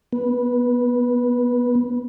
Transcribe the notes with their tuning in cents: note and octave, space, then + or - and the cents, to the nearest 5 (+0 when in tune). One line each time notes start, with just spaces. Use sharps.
B3 -15